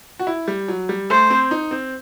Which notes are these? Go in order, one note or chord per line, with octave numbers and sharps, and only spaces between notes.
F#4
E4
G3
F#3
G3
A3 C5
C4
D#4
C4